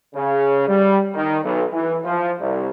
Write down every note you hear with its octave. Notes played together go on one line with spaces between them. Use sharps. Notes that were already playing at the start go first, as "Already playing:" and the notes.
C#3
G3
D#3
B1
E3
F3
C2